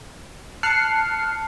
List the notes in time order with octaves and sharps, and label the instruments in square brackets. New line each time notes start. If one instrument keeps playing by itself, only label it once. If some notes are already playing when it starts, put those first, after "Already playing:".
[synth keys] A5 F6 F#6 C7 C#7